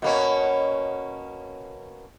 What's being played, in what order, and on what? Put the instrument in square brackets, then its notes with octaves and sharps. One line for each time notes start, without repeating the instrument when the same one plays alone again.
[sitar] B2 A#3 C#4